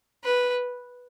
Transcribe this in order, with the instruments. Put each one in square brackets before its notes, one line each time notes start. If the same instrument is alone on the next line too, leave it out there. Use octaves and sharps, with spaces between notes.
[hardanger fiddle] B4